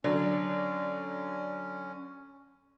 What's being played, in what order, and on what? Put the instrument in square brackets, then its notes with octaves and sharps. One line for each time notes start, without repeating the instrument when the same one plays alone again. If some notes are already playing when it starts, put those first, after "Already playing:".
[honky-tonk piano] D3 F#3 D4 [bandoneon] C#4